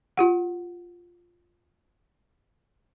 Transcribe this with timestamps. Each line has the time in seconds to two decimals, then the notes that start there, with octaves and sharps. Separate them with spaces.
0.17 F4 G4 F#5